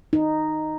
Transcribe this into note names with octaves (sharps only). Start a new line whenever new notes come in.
D#4